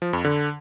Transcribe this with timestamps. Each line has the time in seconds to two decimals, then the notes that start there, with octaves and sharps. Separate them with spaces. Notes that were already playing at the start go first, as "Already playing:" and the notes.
0.02 F3
0.13 F2
0.24 D3